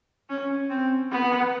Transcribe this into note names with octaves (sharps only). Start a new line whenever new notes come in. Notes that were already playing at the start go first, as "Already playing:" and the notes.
C#4
C4
B3